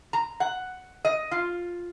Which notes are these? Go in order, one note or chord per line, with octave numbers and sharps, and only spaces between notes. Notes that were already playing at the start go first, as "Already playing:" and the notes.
A#5
F#5
D#5
F4